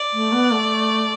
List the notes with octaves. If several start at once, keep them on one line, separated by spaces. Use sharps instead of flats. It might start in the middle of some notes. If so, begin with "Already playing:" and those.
Already playing: D5
A3
B3
A3